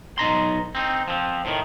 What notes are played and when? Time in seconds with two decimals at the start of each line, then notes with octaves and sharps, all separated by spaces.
0.18 B1 D#4 A#5 C6
0.75 C4 D#4
1.08 F3 C4
1.45 A2 D#3